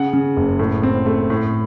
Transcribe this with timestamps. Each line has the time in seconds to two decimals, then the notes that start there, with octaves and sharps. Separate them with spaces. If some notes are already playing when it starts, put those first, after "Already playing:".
Already playing: C#3 F#5
0.13 C#3
0.37 F#1
0.59 A2
0.83 C4
1.06 A3
1.30 A2